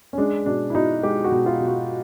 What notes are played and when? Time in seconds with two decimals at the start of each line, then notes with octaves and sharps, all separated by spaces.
0.13 C#4
0.18 G#3 D4
0.46 B2 D4
0.70 E4
0.74 B2 D#4
1.03 G#3 G4
1.24 F#4
1.31 B2
1.46 F4
1.60 B2
1.67 F#4